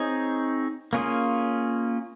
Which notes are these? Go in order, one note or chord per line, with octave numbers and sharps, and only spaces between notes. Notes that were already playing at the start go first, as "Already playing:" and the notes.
Already playing: C4 D#4 G#4 C#5
A#3 C#4 F4 G#4